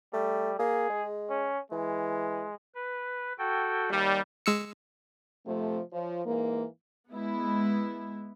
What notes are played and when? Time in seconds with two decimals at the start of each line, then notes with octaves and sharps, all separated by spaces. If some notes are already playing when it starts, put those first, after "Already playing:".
0.13 G3 A3
0.59 A#3 G#4
0.89 G#3
1.30 C#4
1.71 E3 G#3
2.75 B4
3.39 F#4 A4 G5
3.90 D#2 G3
4.46 G#3 E6 C#7
5.46 C3 F3 A3
5.93 F3 C#5
6.26 G#2 E3 A#3
7.11 G#3 B3 E4